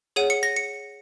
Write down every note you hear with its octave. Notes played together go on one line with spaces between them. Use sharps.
G#4 C#5 F#5 D#7
C#7
A#6
C#7